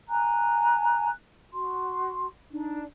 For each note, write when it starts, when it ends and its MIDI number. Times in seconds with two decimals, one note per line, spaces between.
0.08 1.10 80
0.08 1.10 82
0.08 1.10 90
1.52 2.27 66
1.52 2.27 84
2.51 2.83 62
2.51 2.83 63